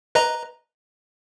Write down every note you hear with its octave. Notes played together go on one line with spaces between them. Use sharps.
B4 D#5 A#5